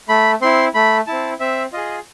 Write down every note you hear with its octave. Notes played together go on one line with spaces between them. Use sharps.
A3 B5
C4 E4 C6
A3 B5
C4 E4 A5
C4 E5
F4 G#4 D#5